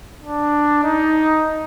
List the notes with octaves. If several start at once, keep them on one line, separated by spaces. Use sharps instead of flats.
D4
D#4